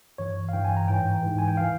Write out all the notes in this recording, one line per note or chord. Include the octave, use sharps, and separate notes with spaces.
G2 E3 C#5
F5
G2 E3 G5
G#5
A#5
G#2 E3 G5
G#2 E3
G#5
G5
E3 F5